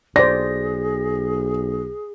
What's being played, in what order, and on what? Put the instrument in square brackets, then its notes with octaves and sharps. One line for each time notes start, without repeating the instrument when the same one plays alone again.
[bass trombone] B1 [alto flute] G#4 [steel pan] C5 D5 [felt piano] A#6